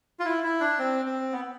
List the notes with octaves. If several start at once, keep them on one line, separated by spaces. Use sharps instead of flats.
F4
E4
E4
D4
C4
C4
B3